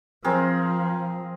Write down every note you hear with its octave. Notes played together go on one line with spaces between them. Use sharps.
F3 C4 G#4 A#4